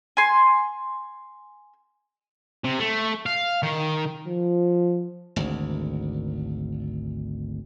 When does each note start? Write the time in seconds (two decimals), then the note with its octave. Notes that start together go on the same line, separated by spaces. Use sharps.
0.17 G#5 C6
2.65 C3
2.79 A3
3.26 F5
3.63 D#3
4.27 F3
5.36 G#1 D2